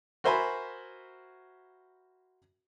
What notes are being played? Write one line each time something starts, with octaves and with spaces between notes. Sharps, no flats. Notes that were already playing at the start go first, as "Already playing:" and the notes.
F#4 A#4 C5 E5 G#5 B5